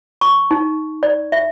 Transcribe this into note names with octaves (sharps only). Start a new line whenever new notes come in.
C#6
D#4
D5
E5